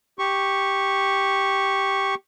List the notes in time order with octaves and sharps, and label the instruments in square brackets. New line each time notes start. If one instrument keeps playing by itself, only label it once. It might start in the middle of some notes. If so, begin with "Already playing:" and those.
[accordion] G4 C#6